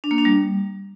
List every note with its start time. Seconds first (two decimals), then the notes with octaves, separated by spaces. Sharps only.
0.04 D4
0.11 A#3
0.18 D4
0.25 G3